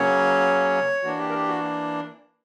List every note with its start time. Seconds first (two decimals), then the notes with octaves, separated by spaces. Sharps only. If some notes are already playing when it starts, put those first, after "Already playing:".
Already playing: C#3 F#3 A#3 C#4 C#5
1.03 E3 A#3 D4 F#4
1.19 G4
1.29 A#4
1.34 G4
1.49 F#4